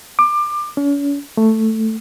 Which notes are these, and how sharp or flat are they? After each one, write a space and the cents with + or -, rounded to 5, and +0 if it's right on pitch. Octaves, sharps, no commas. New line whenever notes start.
D6 +25
C#4 +40
A3 +5